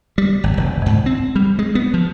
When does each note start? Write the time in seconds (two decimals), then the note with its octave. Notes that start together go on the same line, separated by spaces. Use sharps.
0.18 G3
0.44 G#1
0.57 F1
0.86 G#2
1.06 C4
1.35 G3
1.59 G#3
1.75 B3
1.94 F3